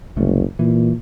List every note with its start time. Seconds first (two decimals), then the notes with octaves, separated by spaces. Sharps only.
0.17 F#1 C2 A3
0.59 A#2 E3